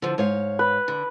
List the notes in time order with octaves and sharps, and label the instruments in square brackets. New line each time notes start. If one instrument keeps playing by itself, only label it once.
[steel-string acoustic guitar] D3 F3
G#2 C#5 F5
[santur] B4
[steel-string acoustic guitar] D3